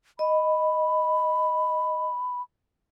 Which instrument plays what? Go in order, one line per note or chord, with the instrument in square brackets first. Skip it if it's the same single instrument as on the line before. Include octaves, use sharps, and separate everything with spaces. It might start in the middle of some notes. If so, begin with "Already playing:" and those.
[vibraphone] D#5 [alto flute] B5